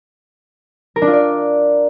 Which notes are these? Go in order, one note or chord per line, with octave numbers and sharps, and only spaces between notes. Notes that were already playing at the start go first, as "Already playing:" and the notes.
A#4
D4
F4
D5